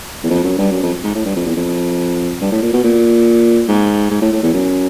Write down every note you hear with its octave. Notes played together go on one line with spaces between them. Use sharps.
E2
F2
F#2
G2
F#2
F2
G#2
A2
G2
F2
E2
F2
G2
A2
A#2
B2
A#2
G#2
G#2
A2
A2
E2
F#2